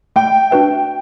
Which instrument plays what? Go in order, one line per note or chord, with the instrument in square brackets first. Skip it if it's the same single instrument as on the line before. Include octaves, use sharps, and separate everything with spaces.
[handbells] A3 [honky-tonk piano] G5
[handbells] D4 F#4 B4 E5